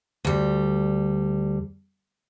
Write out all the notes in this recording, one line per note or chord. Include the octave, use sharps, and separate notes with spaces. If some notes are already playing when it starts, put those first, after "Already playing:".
D2 G3